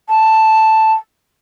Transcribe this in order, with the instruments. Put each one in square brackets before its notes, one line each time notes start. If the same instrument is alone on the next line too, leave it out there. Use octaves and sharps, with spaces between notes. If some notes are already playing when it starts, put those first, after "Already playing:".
[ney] A5